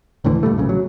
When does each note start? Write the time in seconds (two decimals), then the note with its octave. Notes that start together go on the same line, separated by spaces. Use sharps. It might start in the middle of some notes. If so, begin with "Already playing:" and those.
0.24 D#1 A2 D3 E3
0.43 A#2 G3 A3
0.58 B1 A#2 C#3
0.69 F#3